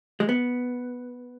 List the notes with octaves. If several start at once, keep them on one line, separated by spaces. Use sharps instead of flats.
G#3
B3